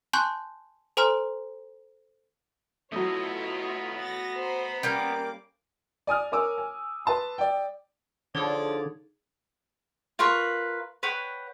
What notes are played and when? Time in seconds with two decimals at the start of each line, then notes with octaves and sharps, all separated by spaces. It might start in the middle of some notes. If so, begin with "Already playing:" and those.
0.13 G#5 A5 C6 C#6 F#6 G6
0.97 A4 C5 G#5 A#5 C6 F6
2.92 F#3 A3 B3 E4 F4 C#5 D#5
3.99 A6 A#6
4.38 C5 A#5 B5
4.83 G3 A#3 C#4 A#4 D6
6.07 D5 G#5 D#6 F6
6.32 A#4 C#5 G#5 D6 E6
6.58 G#5
7.05 B4 A5 C6
7.38 D5 G5
8.35 D3 F3 D#4 G#4 C#5 D5
10.19 F4 A#4 B4 C#6
11.03 B4 C#5 F#5 G5